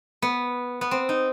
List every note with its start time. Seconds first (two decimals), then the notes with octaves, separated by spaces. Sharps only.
0.22 B3
0.81 B3
0.91 C4
1.09 D#4